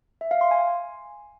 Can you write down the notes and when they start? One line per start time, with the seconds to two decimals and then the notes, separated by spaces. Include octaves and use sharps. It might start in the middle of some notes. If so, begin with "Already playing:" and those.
0.21 E5
0.31 F5
0.41 C6
0.51 G#5